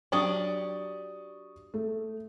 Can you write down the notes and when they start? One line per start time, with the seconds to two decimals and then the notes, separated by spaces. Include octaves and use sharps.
0.12 F#3 D4 G4 C#6 D#6
1.74 A3